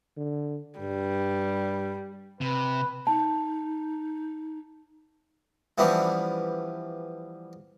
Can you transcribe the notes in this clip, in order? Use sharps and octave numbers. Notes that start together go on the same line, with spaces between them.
D3
G2 G3
C3 B4
D#4 A5
E3 F3 G3 B3 C#4 D4